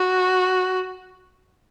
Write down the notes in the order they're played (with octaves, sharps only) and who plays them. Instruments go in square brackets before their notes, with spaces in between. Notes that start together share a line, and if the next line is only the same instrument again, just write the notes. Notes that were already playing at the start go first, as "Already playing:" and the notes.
Already playing: [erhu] F#4